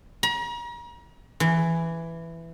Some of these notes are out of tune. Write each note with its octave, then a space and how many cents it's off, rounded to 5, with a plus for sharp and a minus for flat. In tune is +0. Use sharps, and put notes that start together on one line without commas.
A#5 +40
E3 +10